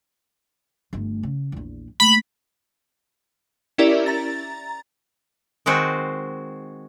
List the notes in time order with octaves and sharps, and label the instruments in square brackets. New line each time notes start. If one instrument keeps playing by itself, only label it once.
[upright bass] G1 A3
C#3
A#1 E2
[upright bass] A3 A#3 [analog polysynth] B5
[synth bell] C#4 E4 G4 A#4 D5 E5
A#5 A6
[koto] D#3 G#3 C4 F#4